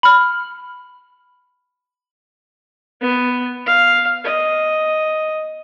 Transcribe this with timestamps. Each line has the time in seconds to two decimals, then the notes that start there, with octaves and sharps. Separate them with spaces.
0.03 B5 F6
3.01 B3
3.66 F5
4.24 D#5